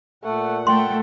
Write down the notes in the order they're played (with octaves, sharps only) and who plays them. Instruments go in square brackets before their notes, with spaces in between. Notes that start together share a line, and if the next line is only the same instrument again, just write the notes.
[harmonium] A#2 F#5 [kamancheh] A3
[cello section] A3 [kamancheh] G5 [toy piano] C6